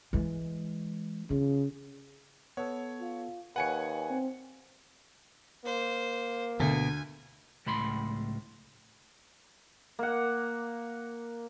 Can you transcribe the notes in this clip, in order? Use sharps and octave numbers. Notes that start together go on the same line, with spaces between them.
E3 G#3
C#3 F4
B3 A4 C#5
F4
D#2 B4 C#5 F#5 G#5 C#7
C4
A#3 C5
D2 B2 G#5
C#2 A2 B5 C6
A#3 F#5